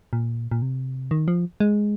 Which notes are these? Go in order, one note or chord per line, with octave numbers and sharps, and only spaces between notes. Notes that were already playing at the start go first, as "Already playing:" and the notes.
A#2
A#2
C3
D#3
F3
G#3